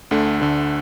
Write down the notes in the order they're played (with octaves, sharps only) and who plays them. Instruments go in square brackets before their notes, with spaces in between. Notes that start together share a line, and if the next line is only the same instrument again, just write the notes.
[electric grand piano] D2 D3 A3
D2 D3 A3